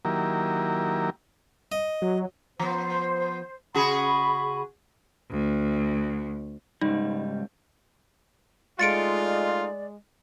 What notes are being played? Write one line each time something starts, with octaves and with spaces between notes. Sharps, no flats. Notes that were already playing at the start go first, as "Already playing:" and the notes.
D#3 F#3 A#3 E4 G4 A#4
D#5
F#3
F3 B3 C5
C#3 F#4 G#4 B5
D2
C#2 G#2 G3 D#4
G#3 A3 D#4 F4 D5 A6 C#7 D7